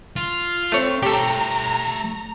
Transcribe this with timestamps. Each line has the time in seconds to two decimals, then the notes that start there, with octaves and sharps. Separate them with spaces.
0.16 F4
0.72 A3 C4 C#5
1.03 A3 G4 A4 G5 A#5